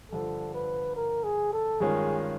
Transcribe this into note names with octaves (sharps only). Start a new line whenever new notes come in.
G2 D3 F3 A4
B4
A#4
G#4
A4
G2 D#3 G#3 C#4 F4 G#4